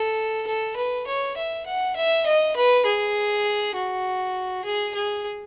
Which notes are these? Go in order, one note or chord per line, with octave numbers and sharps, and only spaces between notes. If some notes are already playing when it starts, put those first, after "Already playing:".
Already playing: A4
A4
B4
C#5
E5
F#5
E5
D#5
B4
G#4
F#4
G#4
G#4